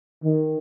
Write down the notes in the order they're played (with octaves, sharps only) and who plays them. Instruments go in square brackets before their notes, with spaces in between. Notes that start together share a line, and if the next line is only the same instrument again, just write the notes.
[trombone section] D#3